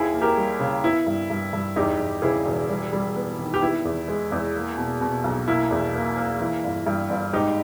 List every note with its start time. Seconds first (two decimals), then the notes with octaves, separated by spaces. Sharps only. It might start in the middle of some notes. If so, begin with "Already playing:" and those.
Already playing: D#2 E4 G#4
0.14 A#3
0.22 G4 A#4
0.37 G3
0.60 C#3
0.83 B3 E4
1.07 G2
1.30 G2
1.53 G2
1.76 E2 D#4 G4
2.00 E2
2.22 C#3 E4 G#4
2.46 E1
2.69 G3
2.93 G3
3.16 B3
3.39 D#3
3.54 G4
3.62 B3 E4
3.85 E2
4.08 G#3
4.32 E2
4.55 A#3
4.77 B2
5.01 B2
5.24 B1
5.47 A#3 E4
5.71 E2
5.94 A#3
6.17 A#3
6.40 E3
6.64 G1
6.87 G2
7.10 G1
7.33 G#2 D#4 G4